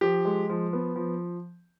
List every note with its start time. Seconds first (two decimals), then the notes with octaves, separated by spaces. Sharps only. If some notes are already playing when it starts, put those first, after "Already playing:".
0.01 F3 G4
0.25 G#3
0.50 F3
0.73 B3
0.96 F3